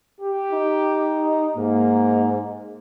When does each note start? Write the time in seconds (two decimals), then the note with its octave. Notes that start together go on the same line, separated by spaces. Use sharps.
0.21 G4
0.52 D#4
1.57 G#2 A#3